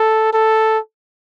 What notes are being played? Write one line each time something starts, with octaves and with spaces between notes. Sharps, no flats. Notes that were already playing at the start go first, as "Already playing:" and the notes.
Already playing: A4
A4